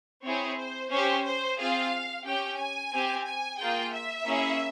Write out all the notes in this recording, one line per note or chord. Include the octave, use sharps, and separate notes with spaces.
C4 E4 G#4 C#5
C5
C#4 G4 C5
C5
C4 F4 G#4 F5
C#4 G4 G5
G#5
C4 G4
G#5
A#3 F4 G#4 G5
E5
A#3 C#4 E4 G#4